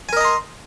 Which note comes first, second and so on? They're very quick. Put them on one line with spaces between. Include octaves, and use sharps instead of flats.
G#5 A#4 D#5 A#5 C6